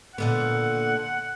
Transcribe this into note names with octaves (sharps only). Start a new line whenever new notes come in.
A#2 D3 B3 F#5